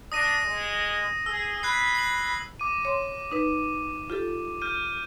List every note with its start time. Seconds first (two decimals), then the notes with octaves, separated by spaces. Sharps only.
0.12 D4 D#6 A#6 D#7
0.44 G#3
1.26 G#4 E6
1.63 B5 F#6 G#6 C7
1.95 C7 F#7
2.60 D6 D#7
2.85 C#5 C6
3.32 D#4 B4
4.10 F4 G4 A4
4.61 F6 G6 D#7